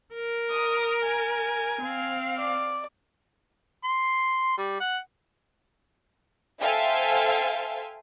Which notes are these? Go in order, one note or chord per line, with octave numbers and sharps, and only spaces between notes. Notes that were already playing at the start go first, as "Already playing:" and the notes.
A#4
D#6
G#5
C4 F5
D5
C6
G3
F#5
A4 C5 E5 F5 G5 G#5